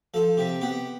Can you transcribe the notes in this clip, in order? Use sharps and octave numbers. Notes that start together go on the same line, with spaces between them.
F3 A4
C3 G4
B3 G4